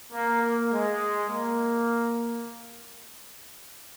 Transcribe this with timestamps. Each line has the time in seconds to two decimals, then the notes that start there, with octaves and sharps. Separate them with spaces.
0.13 A#3
0.42 A#3
0.72 G#3
1.30 A#3